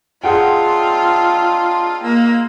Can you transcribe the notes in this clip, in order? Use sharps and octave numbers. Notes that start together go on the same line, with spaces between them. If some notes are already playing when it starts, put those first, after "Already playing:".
C4 D4 D#4 F4 G#4 F#5 G5
G#3 A#3 E6